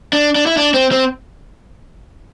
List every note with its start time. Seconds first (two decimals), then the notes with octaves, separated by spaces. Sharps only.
0.13 D4
0.35 D4
0.46 E4
0.57 D4
0.74 C4
0.92 C4